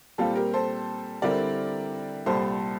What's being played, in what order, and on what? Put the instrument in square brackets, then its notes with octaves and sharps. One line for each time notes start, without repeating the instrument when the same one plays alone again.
[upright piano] A#2 G3 C4 [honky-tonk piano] F4 A4
[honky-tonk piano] G4 A#4
A4 C5
[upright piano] D3 G3 C4 E4 [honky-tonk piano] A#4 D5
[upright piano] C2 A#2 G3 [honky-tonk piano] A4 C5